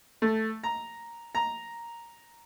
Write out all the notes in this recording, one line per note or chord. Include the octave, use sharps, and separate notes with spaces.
A3
A#5
A#5